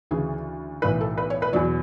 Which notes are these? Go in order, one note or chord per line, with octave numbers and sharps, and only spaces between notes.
D2 C#3 E3 G#4
B1 A2 E3 B4
A4
B4
C#5
B4
E2 B2 F#3 D5